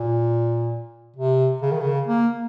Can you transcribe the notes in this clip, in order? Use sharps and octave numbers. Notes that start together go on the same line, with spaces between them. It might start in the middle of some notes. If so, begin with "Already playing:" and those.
Already playing: A#2
C3
C#3
D#3
C#3
A#3